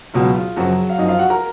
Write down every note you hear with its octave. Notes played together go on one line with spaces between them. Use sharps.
C#2 B2 F#3 F4
F4
F#2 C#3 F3 F#3 F#4
F5
F#2 F3 D#4 D#5
F4 F5
F#4 F#5
A#4 A#5